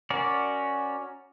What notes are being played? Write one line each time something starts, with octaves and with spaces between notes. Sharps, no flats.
C#4 F#4 A#4 D5